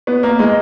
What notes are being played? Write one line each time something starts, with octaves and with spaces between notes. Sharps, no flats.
B3
A#3
G#3